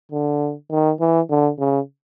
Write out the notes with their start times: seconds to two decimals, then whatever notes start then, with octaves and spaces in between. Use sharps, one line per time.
0.12 D3
0.71 D#3
1.00 E3
1.30 D3
1.59 C#3